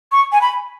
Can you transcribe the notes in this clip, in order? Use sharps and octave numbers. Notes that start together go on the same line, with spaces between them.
C#6
G#5
B5